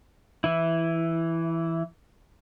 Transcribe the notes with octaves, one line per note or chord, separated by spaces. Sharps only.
E3 E4